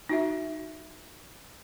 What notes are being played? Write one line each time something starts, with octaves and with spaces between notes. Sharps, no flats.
D#4 F#4 E5